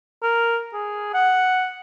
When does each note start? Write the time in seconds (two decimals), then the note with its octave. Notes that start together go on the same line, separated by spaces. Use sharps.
0.23 A#4
0.73 G#4
1.14 F#5